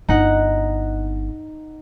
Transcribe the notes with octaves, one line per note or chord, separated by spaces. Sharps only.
G1 D#4 F#5